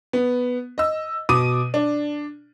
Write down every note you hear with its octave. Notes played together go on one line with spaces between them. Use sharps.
B3
D#5 E6
B2 D6 D#6 D#7
D4